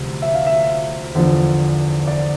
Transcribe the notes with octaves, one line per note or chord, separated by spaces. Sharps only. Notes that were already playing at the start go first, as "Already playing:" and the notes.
Already playing: D2 C3 F3
E5
F5
E5
E2 D3 F3
D5